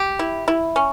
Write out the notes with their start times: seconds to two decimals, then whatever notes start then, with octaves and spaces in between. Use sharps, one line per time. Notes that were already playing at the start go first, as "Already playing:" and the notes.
Already playing: G4
0.19 E4
0.48 E4
0.76 C#4